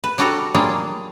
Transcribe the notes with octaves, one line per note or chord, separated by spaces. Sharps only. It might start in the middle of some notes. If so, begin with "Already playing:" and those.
B4
G3 D4 F#4 A4 F#5 A#5
F#3 G3 A#3 D4 F4 G#4